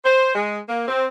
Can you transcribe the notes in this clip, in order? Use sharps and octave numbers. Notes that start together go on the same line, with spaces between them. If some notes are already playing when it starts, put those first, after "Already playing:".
C5
G#3
A#3
C4